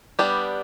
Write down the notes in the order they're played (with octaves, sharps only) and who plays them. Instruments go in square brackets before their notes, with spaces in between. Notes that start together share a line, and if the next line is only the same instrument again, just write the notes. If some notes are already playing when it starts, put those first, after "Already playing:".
[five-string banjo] G3 B3 D4 G4